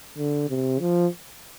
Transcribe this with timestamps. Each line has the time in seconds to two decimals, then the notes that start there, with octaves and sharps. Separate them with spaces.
0.18 D3
0.49 C3
0.80 F3